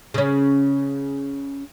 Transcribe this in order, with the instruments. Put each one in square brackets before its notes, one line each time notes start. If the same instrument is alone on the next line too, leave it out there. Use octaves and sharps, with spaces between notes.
[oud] C#3 C#4